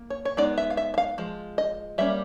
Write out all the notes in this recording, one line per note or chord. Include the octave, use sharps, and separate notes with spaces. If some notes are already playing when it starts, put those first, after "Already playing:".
Already playing: A#3
C#5
C#5
G#3 B3 D#4 D5
E5
F5
E5
E5
F5
F3 G#3
D#5
G3 A#3 C#4 E5